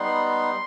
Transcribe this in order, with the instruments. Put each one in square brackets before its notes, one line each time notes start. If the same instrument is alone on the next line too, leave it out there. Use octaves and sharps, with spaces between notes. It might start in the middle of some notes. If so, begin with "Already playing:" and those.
Already playing: [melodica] G3 B3 D#4 C6